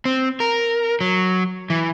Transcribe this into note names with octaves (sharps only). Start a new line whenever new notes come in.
C4
A#4
F#3
E3